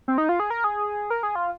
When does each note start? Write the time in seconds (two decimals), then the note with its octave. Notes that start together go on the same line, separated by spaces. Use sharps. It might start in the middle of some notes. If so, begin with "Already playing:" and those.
0.08 C4
0.18 D#4
0.29 F4
0.40 G#4
0.50 A#4
0.64 G#4
1.10 A#4
1.23 G#4
1.35 F4